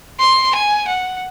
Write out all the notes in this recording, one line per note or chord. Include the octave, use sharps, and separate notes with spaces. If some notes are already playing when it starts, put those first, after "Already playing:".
C6
G#5
F#5